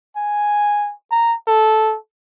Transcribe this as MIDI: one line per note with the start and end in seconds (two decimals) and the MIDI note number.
0.16 0.92 80
1.11 1.34 82
1.48 1.96 69